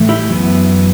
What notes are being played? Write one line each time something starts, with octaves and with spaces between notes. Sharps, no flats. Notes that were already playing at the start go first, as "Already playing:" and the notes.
Already playing: A2 E3 A3
E4 G4
F#2 E3 B3